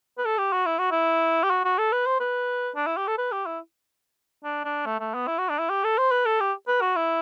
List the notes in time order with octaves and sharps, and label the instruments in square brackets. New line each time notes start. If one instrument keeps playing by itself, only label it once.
[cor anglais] B4
A4
G4
F#4
E4
F#4
E4
G4
F#4
F#4
A4
B4
C5
B4
D4
E4
G4
A4
B4
G4
E4
D4
D4
A3
A3
B3
E4
F#4
D4
E4
G4
A4
C5
B4
A4
G4
B4
F#4
E4